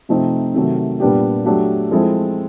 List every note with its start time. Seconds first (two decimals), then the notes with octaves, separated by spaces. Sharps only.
0.09 C3 F3 A3 C4 D#4
0.54 C3 D#3 F#3 A3
1.00 A#2 G3 B3 D4 G4
1.46 F#3 A3 D4 G4
1.91 F3 G#3 C4 E4 A4